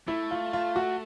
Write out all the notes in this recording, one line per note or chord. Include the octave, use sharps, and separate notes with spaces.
A3 E4
F4
F4
F#4